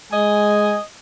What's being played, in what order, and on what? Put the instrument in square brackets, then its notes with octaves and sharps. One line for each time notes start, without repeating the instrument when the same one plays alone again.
[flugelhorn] G#3 [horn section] D#5 G#5